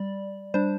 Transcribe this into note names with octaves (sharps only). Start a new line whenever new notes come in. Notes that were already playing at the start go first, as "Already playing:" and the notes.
Already playing: G3 D5
G3 D4 C5